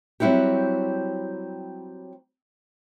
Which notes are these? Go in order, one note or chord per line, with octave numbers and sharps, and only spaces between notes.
F#3 G3 C4 E4 F#4 G4